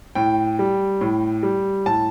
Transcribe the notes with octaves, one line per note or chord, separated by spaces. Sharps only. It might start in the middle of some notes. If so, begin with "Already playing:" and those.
A2 G5
G3
A2
G3
A2 A5